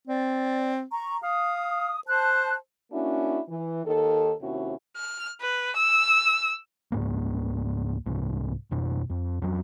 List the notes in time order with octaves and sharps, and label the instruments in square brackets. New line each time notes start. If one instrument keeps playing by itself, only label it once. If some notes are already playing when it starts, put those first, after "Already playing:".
[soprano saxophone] C4 [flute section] D5
[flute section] A#5 C#6
[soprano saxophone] F5 [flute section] D#6
[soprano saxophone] C5 [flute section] A5 F#6
[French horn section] A#3 C#4 D4 E4 F#4
E3
D#2 D#3 A4
D#2 C3 C#4 E4 F#4
[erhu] F6
B4
E6
[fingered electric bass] C#2 G#2 A#3
C2 G#2 C3
F2 B2
F2
F2 F#3